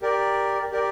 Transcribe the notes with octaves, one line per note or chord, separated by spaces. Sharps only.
G4 A#4 D5
G4 A#4 D5